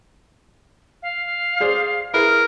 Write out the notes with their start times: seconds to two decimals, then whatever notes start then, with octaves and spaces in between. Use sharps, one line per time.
1.02 F5
1.60 G#4 C5 D5
2.14 E4 G#4 A#4 B4